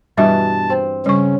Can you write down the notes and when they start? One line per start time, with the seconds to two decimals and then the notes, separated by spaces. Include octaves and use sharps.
0.18 G2 B2 E3 G3 E5 A5
0.70 C4
1.06 C#3 G3 C#4 C#6